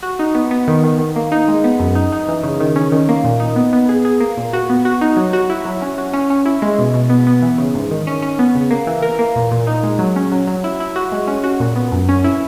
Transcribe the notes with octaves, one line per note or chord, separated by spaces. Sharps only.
F#4
D#4
B3
B3
D#3
D#3
D#3
A#3
D#4
G#3
B3
F#2
D#4
D#4
E3
C#3
D#3
C#4
D#3
A#3
A#2
D#4
B3
B3
G#4
G#4
A#3
A#2
F#4
B3
F#4
D#4
F#3
F#4
E4
F#3
C#4
F#4
C#4
C#4
E4
G#3
B2
B2
B3
B3
E3
C#3
G#2
D#3
C#4
C#4
B3
C#3
A#3
E3
A#4
A#3
A#2
A#2
D#4
G#3
F#3
C#4
F#3
F#3
E4
E4
F#4
G#3
C#4
F#4
A#2
B3
F#2
C#4
E4